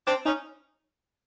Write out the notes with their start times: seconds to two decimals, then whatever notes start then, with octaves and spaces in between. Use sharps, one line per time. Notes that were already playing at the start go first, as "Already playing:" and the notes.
0.07 C4 D4
0.26 C#4 D#4